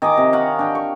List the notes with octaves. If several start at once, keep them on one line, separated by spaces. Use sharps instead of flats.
D#3 D#5 G#5 D6
C3
C#5 F5 F#5 A#5
D4 G5
C#6